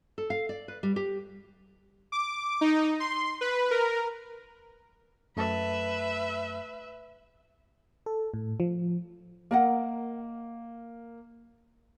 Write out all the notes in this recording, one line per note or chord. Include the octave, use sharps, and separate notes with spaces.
A4
F5
D5
B4
G3
G4
D6
D#4
C6
B4
A#4
F#2 A3 B4 E5 A5
A4
A2
F3
A#3 A#4 D#5 F#5